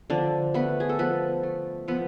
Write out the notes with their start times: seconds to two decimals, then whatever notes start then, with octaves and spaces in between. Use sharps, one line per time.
0.10 D3 F3 D4
0.54 A3 B3 B4
0.80 G#4
0.89 A4
0.99 F3 B3 B4
1.43 A3
1.88 F3 B3 B4